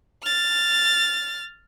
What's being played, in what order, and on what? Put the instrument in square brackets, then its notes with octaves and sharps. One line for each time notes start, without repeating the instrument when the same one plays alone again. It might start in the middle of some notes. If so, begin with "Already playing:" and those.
[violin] F6 A6